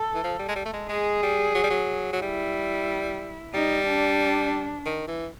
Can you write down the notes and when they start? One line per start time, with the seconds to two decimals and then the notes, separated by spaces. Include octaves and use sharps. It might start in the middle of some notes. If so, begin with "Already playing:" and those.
Already playing: A4
0.15 E3
0.24 F3
0.39 G3
0.48 G#3
0.56 G3
0.65 A3
0.73 G#3
0.89 G#3 G#4
1.23 G3
1.55 F#3
1.63 G3
1.70 F#3
2.13 F#3
2.21 G3 E4
3.53 G3 D#4
3.87 D4
4.85 D#3
5.07 E3